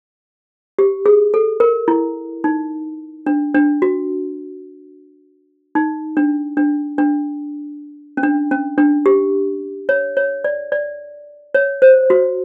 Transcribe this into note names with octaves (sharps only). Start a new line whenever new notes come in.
G4
G#4
A4
A#4
E4
D#4
D4
D4
F#4
D#4
D4
D4
D4
C#4
D4
C#4
D4
G4
C#5
C#5
D5
D5
C#5
C5
F#4